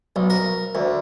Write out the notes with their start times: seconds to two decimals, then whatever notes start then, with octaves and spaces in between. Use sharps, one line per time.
0.16 B1
0.30 A#4
0.75 D2